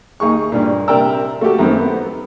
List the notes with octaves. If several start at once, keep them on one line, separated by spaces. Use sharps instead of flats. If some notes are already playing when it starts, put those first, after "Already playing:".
D#2 D#4 G#4 C#6
G2 A#2
C3 A#4 D5 G5 A#5 E6
A3 F#4 G4 A4
F#2 D#3 A3 B3 C4
B3